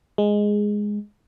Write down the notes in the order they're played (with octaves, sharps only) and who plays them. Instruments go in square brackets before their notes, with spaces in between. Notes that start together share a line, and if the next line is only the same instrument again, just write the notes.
[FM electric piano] G#3